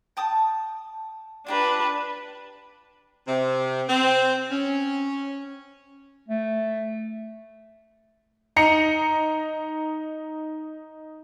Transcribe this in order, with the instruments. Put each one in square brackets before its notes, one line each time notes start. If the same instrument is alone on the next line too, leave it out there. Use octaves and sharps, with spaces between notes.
[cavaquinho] G5 A5 D#6
[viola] D4 B4 [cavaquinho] F4 G4 A#5
[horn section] C3
C4
C#4
[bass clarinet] A3
[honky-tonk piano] D#4 A#5 C#7